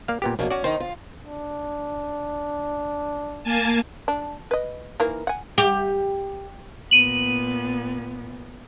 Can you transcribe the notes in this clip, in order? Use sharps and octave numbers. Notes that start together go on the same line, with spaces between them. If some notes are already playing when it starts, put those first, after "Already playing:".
A#3 D5 F5
A#2 B3 G4
A#1 B2 F#3 A#3
C#4 F#4 D5
D#3 D#4 C5
F4
D4
A#3 G#5 A5
D4
B4 D#5
D#3 E3 A#3
F#5 G#5
G4
A#2 B3 D#7 F#7